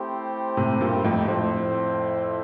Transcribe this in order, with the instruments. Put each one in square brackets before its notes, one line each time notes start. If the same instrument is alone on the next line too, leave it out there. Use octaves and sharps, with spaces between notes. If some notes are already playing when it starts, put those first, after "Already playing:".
Already playing: [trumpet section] A3 C4 E4 G4 C5
[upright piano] A2 C3
G2 A#2
F2 A2
[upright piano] F2 A2 [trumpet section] C4 E4 A4 C5